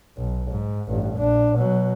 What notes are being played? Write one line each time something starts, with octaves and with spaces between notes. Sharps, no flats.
B1
G#2
A1 G2
A#1 D4
B2 F#3